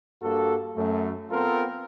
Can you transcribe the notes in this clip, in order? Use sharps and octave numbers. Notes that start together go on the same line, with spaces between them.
G2 A#3 F#4 A4
F#2 A3
B3 C4 F4 A4 A#4 C5